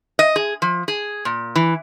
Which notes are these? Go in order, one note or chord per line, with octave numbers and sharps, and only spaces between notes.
D#5
G#4
F3
G#4
A#2
E3